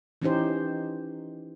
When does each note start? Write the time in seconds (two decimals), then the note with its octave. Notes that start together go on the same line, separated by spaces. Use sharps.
0.22 E3 C#4 D#4 G4 C5